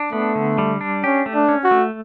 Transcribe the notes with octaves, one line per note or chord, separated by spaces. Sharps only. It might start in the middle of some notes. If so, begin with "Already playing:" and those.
Already playing: D4
A3 B3
D3
G3
D4
C#4 G4
A3
D4
C#4
F#4
A3